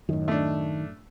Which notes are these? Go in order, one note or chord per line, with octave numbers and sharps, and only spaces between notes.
F#2 A2 D#3
A3 D4